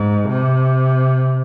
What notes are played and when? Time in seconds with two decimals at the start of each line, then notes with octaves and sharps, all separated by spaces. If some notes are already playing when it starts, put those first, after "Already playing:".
Already playing: G#2
0.29 C3